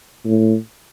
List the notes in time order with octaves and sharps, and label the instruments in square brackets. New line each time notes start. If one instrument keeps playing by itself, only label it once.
[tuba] A2